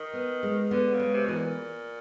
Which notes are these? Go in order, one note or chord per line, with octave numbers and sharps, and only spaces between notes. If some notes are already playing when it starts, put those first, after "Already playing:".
Already playing: D#3
B3
G#3
D3 B3
C#3
G#3
C3
B2 E3
A#2